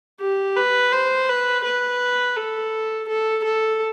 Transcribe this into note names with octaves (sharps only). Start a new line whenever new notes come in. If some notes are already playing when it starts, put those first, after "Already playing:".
G4
B4
C5
B4
B4
A4
A4
A4